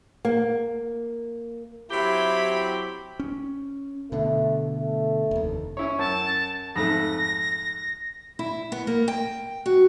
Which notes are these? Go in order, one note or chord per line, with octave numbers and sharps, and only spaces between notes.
A#3
F#3 C4 E4 G4 B5
C#4
B2 D3 A3
A3
F1 D#2
C#4 E4 C#5
F#2 A5
F2 G#2 A3 A#6
E4
B3
A#3
G5
F#4